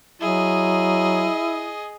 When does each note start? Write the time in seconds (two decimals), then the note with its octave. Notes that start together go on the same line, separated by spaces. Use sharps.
0.21 F#3 E4 G#4 D#5